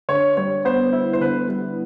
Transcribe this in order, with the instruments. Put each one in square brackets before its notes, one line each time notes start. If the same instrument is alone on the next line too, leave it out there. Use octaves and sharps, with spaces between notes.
[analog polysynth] D3 [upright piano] C#5
[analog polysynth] G3 [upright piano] C#5
[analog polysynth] B3 [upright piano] C5
[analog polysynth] E4
[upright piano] C5
[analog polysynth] D3 [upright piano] B4
[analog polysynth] G3